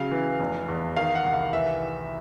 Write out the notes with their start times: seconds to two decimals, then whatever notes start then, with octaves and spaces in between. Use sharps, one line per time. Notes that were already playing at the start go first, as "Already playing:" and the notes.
Already playing: C#3 F#3 F5
0.11 E3
0.40 F1
0.68 E2
0.96 D#3 F5
1.15 F#5
1.25 C2
1.34 F5
1.53 E3 E5